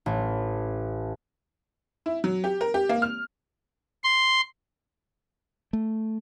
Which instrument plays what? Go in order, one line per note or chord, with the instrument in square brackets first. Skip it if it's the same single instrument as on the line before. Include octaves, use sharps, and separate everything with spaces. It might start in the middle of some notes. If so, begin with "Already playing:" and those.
[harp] A1
[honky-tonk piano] E4
F#3
G4
A#4
G4
A#3
F6
[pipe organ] C6
[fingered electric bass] A3